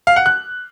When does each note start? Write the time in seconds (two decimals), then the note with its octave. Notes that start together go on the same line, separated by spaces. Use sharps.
0.07 F5
0.16 F#5
0.26 F#6